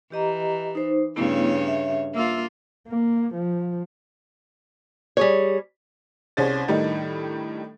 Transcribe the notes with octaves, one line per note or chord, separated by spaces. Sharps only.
E3 G4 D#5 A#5
D#4 C5
G2 C#3 A3 B3 E4 C#5
E5
A#3 F4 E5 E6
A#3
F3
G3 G#4 C#5
C2 C#4 G#4 C5 A6
A2 D#3 G3 D4 D#4